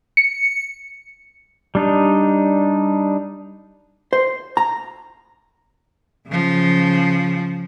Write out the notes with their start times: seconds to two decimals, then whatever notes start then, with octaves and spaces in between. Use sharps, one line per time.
0.17 C#7
1.75 G3 D4 D#4
4.13 C5
4.57 A#5
6.28 C#3 F3